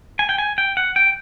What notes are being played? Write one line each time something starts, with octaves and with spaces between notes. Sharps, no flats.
G#5
G5
G#5
G5
F#5
G5